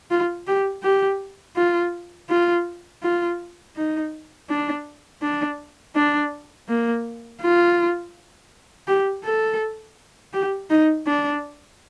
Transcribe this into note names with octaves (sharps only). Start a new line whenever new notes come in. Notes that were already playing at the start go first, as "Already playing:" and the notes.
F4
G4
G4
F4
F4
F4
D#4
D4
D4
D4
A#3
F4
G4
A4
G4
D#4
D4